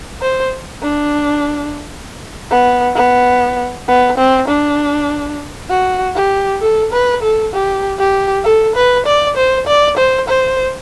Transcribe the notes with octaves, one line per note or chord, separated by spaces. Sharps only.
C5
D4
B3
B3
B3
C4
D4
F#4
G4
A4
B4
A4
G4
G4
A4
B4
D5
C5
D5
C5
C5